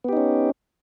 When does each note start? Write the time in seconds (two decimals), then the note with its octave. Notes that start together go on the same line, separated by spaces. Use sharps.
0.04 B3
0.09 G4
0.13 D#4
0.17 C#4